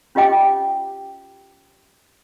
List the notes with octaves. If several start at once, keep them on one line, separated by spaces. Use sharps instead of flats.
C#4 F4 G4 D#5 G5 D6